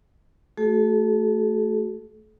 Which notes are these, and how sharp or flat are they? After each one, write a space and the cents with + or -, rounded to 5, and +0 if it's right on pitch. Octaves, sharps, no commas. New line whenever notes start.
A3 +0 F#4 +25 A4 -40